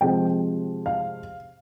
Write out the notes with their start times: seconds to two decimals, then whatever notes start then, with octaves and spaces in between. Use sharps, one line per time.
0.01 C3 F3 G#3 C4 G5
0.86 F5